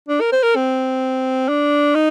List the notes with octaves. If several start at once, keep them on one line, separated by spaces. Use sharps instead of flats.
D4
A#4
C5
A#4
C4
D4
D#4